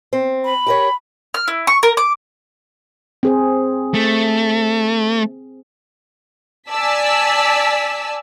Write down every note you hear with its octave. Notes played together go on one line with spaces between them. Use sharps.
C4
B5
G4 A#4 C#5
F6
E4
C#6
A#4
D6
C4 G#4 C5
A3
D5 G#5 A5 E6 B6